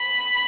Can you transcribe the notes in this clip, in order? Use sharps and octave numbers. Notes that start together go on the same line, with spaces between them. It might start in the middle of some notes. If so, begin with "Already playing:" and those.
Already playing: B5